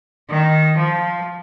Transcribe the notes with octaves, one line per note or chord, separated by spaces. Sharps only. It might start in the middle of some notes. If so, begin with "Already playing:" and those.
D#3
F3